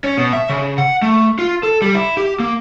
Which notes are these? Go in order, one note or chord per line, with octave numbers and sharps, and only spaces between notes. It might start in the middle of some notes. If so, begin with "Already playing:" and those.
C#4
B2
E5
C#3
F#5
A3
F4
A4
G3
E4
G4
A#3